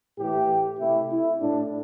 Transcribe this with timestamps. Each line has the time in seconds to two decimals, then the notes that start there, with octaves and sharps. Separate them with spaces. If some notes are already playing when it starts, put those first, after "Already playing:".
0.18 A2 E3 A3 G4
0.80 C3 A3 E4
1.11 E4
1.41 A2 A3 D4